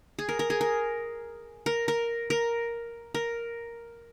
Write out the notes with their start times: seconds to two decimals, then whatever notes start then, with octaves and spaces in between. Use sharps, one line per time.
0.19 G#4
0.29 A#4
0.39 A#4
0.50 G#4
0.61 A#4
1.66 A#4
1.88 A#4
2.30 A#4
3.14 A#4